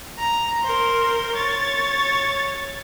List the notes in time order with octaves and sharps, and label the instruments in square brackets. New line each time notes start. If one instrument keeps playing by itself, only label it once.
[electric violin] A#5
A#4 C5
C#5 A6